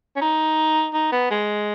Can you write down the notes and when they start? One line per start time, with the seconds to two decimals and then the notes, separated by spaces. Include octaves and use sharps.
0.16 C#4
0.21 D#4
0.94 D#4
1.12 B3
1.31 G#3